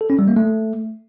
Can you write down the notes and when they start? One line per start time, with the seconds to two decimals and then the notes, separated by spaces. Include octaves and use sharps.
0.01 A4
0.10 C#4
0.19 G3
0.28 A#3
0.36 A3